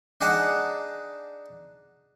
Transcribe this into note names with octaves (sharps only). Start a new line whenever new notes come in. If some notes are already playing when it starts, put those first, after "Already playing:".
D4 D#4 G#4 F#5 A5